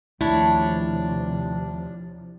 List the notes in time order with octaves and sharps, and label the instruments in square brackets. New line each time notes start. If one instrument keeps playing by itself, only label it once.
[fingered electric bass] D#2 A3 [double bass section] C3 E3 F3 [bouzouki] D4 C#5 [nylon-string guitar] E4